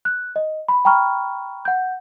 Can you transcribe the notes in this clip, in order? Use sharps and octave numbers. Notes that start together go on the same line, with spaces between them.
F#6
D#5
B5
G5 A#5 B5 C#6 F6
F#5 G6